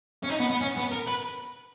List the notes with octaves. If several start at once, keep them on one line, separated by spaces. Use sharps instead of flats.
C#4
D#4
B3
B3
C#4
B3
A#4
B4